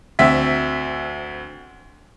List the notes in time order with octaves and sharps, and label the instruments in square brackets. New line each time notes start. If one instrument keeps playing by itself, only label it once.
[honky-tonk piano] D2 C4 E5 B6